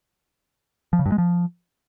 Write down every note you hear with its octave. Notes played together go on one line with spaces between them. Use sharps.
F3
C#3
G2
G#3
F3